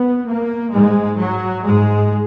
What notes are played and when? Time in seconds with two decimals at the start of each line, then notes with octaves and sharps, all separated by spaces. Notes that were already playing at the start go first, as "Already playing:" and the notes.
Already playing: B3
0.25 A#3
0.71 G#2 G#3
1.18 F#3
1.64 G#2 G#3